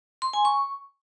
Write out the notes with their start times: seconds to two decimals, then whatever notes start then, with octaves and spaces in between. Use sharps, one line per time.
0.22 C6
0.33 G#5
0.45 C#6